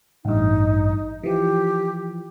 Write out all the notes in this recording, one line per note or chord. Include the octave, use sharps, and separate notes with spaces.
A1 G2 D#4
E3 F3 G4